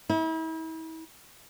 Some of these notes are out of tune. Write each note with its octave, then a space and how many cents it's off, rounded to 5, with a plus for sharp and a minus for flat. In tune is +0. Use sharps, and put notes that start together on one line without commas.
E4 -40